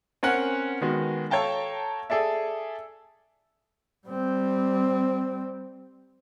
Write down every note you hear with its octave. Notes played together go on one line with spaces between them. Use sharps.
C4 C#4 A#4 F#5 G#5
D#3 G#3 B3 F#4
A4 C#5 F5 G5 A5 A#5
G#4 A4 D5 E5
G3 C4